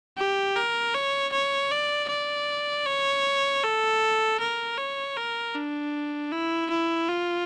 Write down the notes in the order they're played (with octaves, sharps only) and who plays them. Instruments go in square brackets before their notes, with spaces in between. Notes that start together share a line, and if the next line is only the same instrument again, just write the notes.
[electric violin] G4
A#4
C#5
C#5
D5
D5
C#5
A4
A#4
C#5
A#4
D4
E4
E4
F4